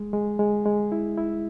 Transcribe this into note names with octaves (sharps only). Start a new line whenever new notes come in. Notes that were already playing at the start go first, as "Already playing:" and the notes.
Already playing: G#3
G#3
G#3
G#3
E4
E4